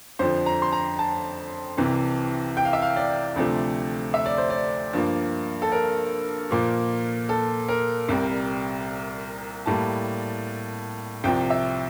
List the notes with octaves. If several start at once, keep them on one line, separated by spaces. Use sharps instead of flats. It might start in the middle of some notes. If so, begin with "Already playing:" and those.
F2 D3 F3 C5
A#5
C6
A#5
A5
C2 C3 E3
G5
F5
E5
F5
D5
D2 C3 F3 A3
E5
D5
C5
D5
G2 F3 A#3
A4
A#4
A#2 F3 A#3
A4
A#4
C2 C3 G3
A2 G3 A#3 A5
C2 C3 F3 G5
E5